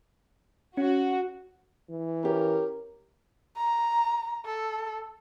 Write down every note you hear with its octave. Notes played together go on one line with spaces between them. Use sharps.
C#4 F#4
E3
C#4 G4 A#4
A#5
A4